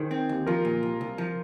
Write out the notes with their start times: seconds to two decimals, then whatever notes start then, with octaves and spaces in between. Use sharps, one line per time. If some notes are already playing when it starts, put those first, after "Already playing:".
Already playing: D#3 G#4 C5
0.11 C4
0.29 D#2
0.47 F3 F4 A#4
0.65 A#2
0.83 C2
1.01 C2
1.18 F3